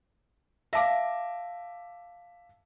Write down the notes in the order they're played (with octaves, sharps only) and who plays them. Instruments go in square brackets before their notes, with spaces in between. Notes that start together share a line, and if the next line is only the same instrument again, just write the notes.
[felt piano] E5 D6 [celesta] F5 A5 A#6